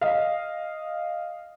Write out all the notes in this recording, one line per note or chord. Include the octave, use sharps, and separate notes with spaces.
D#5 F5